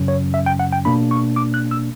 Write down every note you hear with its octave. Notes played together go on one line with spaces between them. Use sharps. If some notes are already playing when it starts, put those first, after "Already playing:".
Already playing: F#2 C#3 F#3 C#4
C#5
E5
G5
F#5
G5
B2 A#3 D4 B5
C#6
D6
F#6
E6